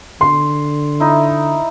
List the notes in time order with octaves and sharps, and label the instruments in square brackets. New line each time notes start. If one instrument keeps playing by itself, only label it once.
[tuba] D3 [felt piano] C6
[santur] D#4 E4